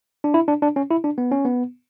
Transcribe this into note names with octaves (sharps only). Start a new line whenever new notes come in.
D4
E4
D4
D4
C#4
E4
D4
B3
C#4
B3